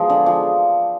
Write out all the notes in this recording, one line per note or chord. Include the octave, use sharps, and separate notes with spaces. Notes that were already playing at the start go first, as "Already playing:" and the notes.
Already playing: F3 G#3 B3 G#4
D3
F3